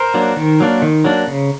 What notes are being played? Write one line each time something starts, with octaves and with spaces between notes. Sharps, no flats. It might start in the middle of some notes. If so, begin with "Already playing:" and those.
Already playing: A#4 C5
F#3 A#3 D4
D#3
F#3 A#3 D4
D#3
F#3 A#3 D4
C#3